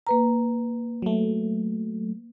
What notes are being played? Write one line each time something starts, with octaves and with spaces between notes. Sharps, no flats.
A#3 B4 A#5
F#3 A3